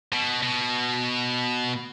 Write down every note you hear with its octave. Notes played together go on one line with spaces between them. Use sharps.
B2
B2